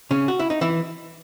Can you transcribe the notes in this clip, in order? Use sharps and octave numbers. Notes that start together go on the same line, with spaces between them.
C#3 C#4
F#4
E4
D#4
E3 E4